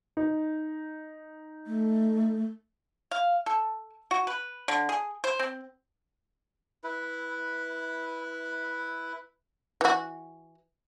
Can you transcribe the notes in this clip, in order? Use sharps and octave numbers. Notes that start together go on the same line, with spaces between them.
D#4
A3
F5
A4
F#4
B4
D3
G#4
C5
C4
E4 B4
E3 F#4